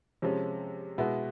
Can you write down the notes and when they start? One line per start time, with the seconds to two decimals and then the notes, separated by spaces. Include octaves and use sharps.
0.22 C3 F3 G#3 C#4
0.98 B2 G#3 B3 E4